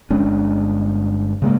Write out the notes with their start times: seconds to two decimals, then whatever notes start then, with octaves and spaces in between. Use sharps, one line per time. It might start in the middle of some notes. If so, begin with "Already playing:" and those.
0.10 G1 G#3 C#4 D4
1.42 C#3 G#3 A#3